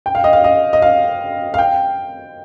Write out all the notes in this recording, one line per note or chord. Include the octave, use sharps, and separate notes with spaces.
G5
F5
D#5
F5
D#5
D#5
F5
F5
G5